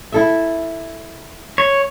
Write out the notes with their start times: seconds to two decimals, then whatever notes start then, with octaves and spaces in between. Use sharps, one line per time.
0.12 E4 A4 E5
1.58 C#5